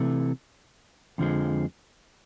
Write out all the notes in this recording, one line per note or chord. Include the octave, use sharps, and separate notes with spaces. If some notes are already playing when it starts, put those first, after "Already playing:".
Already playing: C3 E3 A3
F2 D3 F3 G#3